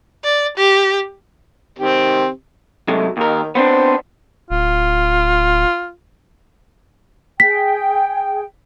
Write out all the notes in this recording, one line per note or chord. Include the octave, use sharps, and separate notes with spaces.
D5
G4
D#3 C4 G4
C3 F#3 G#3 A3
D#2 D#3 A#4
B3 C4 D4 C5
D1 F4
G#4 G5 B6